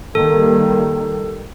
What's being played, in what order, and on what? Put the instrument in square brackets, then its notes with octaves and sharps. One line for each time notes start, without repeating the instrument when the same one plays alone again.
[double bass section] D#3 G3 A#3 [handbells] A4